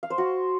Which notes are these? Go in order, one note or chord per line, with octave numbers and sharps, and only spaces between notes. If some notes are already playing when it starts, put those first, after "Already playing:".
F5
C5
F#4